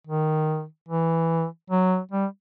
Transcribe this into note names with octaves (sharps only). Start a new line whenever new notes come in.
D#3
E3
F#3
G3